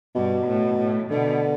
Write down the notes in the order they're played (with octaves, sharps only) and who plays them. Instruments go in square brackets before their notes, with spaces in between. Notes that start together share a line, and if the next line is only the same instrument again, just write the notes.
[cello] G2 [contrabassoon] B2
[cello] A2
A2
[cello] B2 [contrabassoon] D3